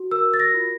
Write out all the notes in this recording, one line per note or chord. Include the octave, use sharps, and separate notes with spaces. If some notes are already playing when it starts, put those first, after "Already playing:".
Already playing: F#4
A#4 E6
A6
A#6
F4